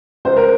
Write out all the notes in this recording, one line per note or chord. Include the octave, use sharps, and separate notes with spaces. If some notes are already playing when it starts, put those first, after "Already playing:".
C#2 C5
A#4